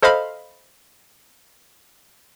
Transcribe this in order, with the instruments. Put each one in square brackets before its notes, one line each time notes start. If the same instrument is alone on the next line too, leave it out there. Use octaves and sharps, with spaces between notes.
[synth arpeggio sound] A4 C5 D#5 F5 B5 F6